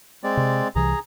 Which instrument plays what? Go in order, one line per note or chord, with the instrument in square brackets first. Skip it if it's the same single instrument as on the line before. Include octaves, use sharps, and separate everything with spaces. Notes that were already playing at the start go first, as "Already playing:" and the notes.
[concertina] G#3 C4 D5
[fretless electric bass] C3
[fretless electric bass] C2 C3 E3 [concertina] G#4 A#5